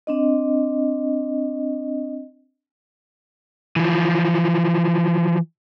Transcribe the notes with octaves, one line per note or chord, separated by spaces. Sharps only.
C4 D4 D#5
E3 F3